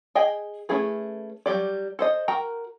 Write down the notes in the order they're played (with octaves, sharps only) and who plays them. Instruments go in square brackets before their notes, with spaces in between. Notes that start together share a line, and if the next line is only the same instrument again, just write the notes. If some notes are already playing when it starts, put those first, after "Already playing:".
[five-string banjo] G#4 D#5 G5 G#5
A3 C#4 E4 G#4 B4
F#3 G3 G4 D5
A4 C5 D#5
F#4 A#4 G5 A#5